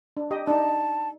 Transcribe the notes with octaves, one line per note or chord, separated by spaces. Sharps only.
D4
G4 D#5
D4 D#4 A5